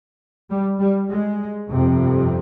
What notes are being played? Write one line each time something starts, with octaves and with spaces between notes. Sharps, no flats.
G3
G3
G#3
G1 F2 C3